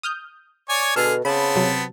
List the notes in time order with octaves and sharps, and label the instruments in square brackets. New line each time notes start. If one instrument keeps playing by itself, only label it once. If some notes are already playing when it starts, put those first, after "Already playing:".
[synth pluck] D#6 F6 G6
[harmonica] C#5 D5 G#5
[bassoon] B2 [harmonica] D3 G#4 F6 [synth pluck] A4
[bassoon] C#3 [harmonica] B3 C4 A5 [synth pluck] B5
[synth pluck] C3 F#3